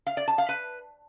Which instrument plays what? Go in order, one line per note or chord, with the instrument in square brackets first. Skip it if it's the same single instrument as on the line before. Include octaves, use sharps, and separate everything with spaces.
[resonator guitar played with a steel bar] F5
D5
A5
F5
B4